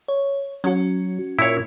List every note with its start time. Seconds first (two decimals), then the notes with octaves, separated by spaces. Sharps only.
0.08 C#5
0.64 F#3 C#4 F#4
1.39 A#2 E4 C#5